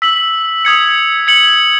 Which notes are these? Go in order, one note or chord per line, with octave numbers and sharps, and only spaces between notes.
E6 B6 F#7
D#6 G#6 C#7
G#6 C#7 F#7